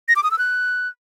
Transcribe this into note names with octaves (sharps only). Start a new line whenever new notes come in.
A#6
D6
D#6
E6
F#6